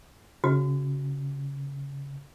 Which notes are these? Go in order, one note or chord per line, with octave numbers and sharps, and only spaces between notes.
C#3 F#4